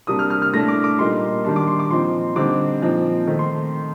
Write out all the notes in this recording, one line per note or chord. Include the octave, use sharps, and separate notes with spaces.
C3 G3 A#3 D4 D#6
F6
F6
F6
A2 A3 D4 A#6
D6
D6
A#2 G3 A#3 D#4 C6
D#3 G3 D4 C6
D6
C6
D6
A#2 F3 C4 D#4 C6
D3 G3 C4 D#4 D6
A#2 F3 C4 D#4
D#3 A3 C4
C6